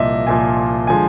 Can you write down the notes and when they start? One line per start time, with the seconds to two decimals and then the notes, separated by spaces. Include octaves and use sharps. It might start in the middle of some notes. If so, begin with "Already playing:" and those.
Already playing: C2 A#2 F3 D#5 E5
0.27 C2 A#2 F3 G#5
0.87 D3 F3 G#3 G#5